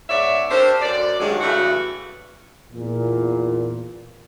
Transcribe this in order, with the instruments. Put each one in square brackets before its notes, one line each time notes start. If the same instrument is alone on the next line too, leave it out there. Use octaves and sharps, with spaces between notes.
[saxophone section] G#2 B3 C#5 D5 E5
D4 G4 A4 A#4 C5
F#2 D5
G2 D#3 F#3 G#3
G2 C#3 E3 A3 F#4 D5
[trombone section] E2 A#2